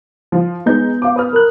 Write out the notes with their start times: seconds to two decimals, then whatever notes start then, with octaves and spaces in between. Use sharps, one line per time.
0.32 F3
0.66 G#3 B3 D#4 G6
1.02 F5 D6
1.16 B4 D#6 F6
1.33 A#4 F#6